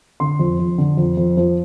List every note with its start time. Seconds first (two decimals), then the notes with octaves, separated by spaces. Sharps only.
0.20 D3 C6
0.39 F2
0.59 F2
0.78 D3
0.97 F2
1.17 F2
1.37 F3